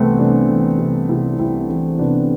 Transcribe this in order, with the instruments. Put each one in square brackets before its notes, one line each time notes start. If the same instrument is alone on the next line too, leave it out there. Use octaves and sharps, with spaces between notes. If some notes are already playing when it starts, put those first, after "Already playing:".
Already playing: [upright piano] C2 C3 E3 A3 B3 C4
C2 B3 D4
E3
C3
C2 E4 G4
C2 C4 E4
E3 C4 E4
C3 B3 D4